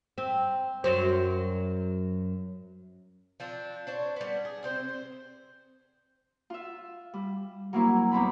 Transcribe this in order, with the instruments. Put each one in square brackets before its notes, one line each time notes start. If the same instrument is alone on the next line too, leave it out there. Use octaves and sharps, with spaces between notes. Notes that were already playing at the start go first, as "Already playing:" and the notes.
[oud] C4
F#2 F#3 C5
[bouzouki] F3 C4 D4
D4 C5 C#5
G3 B3
G#4
C3 C4 C5
C5
[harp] F4 E5
G3
F#3 G3 A#3 C4 E4
D#2 B2 C4 B5